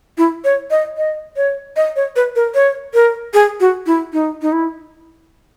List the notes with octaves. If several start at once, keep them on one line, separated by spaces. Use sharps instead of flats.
E4
C#5
D#5
D#5
C#5
D#5
C#5
B4
A#4
C#5
A#4
G#4
F#4
E4
D#4
D#4
E4